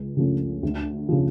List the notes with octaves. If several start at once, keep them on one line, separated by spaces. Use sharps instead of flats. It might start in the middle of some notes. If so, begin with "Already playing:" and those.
Already playing: C#2
C#3 F3 A3 C#4
D2
C#3 F3